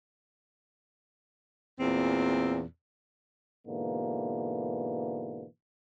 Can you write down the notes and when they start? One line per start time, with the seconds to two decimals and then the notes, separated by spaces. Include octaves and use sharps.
1.80 E2 A#2 C4
3.67 G#2 B2 D3 E3 A#3